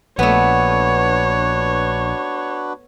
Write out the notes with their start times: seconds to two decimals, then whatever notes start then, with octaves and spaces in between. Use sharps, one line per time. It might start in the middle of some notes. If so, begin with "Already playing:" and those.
0.19 A#1 A3 B3 D4 F#4 B4 C#5